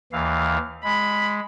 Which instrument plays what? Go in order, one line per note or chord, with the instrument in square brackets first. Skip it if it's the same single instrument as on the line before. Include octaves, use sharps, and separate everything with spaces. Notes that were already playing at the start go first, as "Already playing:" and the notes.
[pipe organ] D#2 E3 F5
[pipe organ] G#3 [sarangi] B5